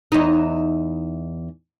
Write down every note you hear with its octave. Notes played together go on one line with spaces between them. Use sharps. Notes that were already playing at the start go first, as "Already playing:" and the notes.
E2 D#4